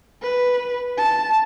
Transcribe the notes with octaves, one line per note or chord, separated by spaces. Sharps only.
B4
A5